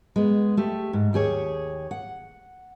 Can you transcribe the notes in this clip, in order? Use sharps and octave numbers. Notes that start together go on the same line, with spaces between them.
G#3 B3
A3 G4
G#2
D#2 G4 G#4 C#5
F#5